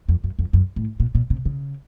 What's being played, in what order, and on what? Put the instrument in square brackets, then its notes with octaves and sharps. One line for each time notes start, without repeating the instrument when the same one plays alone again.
[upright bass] F2
F#2
F2
F#2
A2
A#2
A#2
C3
C#3